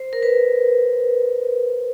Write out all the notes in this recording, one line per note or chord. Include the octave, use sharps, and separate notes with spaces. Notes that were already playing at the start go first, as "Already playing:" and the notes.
Already playing: C5
A#4
B4